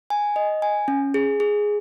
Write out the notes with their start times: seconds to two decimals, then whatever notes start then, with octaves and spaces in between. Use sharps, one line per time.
0.10 G#5
0.36 D#5
0.62 G#5
0.88 C#4
1.14 G#4
1.40 G#4